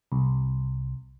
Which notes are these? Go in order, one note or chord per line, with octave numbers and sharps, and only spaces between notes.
C2